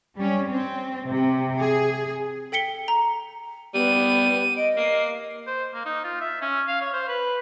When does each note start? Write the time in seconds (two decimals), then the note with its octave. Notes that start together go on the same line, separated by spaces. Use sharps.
0.16 G3 C#4
0.48 C4
1.08 C3
1.57 G#4
2.52 A4 G5 B6 C#7 G7
2.88 A#5
3.74 G3 B3 D#7
4.57 D#5 D7
4.77 A#3 C7
5.47 C5
5.74 A#3
5.85 D#4
6.04 F4
6.21 E5
6.42 C#4
6.68 F5
6.82 C#5
6.93 C5
7.08 B4